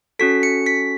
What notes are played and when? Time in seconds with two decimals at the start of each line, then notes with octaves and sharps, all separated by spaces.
0.19 C#4 F#4 A4 B6
0.43 C#7
0.66 B6